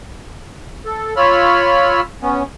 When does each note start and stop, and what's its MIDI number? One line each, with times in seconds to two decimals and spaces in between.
0.85 1.14 69
1.17 2.01 65
1.17 2.01 73
1.17 2.01 83
1.17 2.01 88
1.17 2.01 89
2.22 2.43 59
2.22 2.43 61